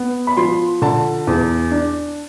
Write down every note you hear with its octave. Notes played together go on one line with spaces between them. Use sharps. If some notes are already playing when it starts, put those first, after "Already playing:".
Already playing: B3
B5
F3 C6
D3 A5
E2
D4